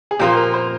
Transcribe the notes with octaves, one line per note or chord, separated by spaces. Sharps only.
G#4
A#2 F3 A#3 F4 G4
A#4
C5